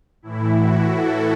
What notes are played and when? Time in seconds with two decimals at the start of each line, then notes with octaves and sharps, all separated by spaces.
0.22 A2 E3 E4
0.57 F#4
0.93 A4